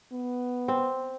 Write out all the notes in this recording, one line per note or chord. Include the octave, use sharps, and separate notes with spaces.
B3
C4